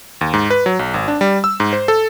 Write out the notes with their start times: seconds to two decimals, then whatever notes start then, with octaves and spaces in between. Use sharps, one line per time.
0.21 D#2
0.34 G#2
0.50 B4
0.66 F#3
0.79 B1
0.94 G#1
1.08 D4
1.21 G3
1.44 E6
1.60 G#2
1.73 C5
1.88 A4